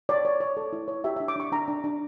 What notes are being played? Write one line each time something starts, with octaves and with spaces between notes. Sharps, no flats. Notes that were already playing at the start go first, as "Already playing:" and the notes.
C#5 D5
C#5
C#5
A4
E4
C#5
G4 E5
E5
D4
D6
D4 C#6
D4 A#5
D4
D4